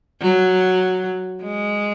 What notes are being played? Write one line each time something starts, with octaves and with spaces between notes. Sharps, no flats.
F#3
G#3